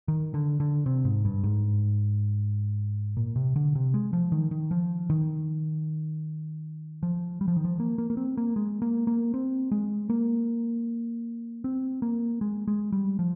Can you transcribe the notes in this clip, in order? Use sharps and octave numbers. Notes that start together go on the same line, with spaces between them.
D#3
D3
D3
C3
G#2
G2
G#2
A#2
C3
D3
C3
G#3
F3
D#3
D#3
F3
D#3
F3
G3
F3
D#3
F3
A#3
A#3
A#3
C4
A#3
G#3
A#3
A#3
C4
G#3
A#3
C4
A#3
G#3
G#3
G3
F3